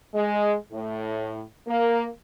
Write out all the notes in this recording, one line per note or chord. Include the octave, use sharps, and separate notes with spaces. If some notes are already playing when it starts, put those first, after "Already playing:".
G#3
A2
A#3